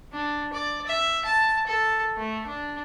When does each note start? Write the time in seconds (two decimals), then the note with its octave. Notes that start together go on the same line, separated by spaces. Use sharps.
0.13 D4
0.53 D5
0.87 E5
1.25 A5
1.67 A4
2.17 A3
2.47 D4